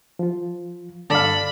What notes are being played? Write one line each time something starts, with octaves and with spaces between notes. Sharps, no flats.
F3 F4
G2 D3 A4 D5 F5 B5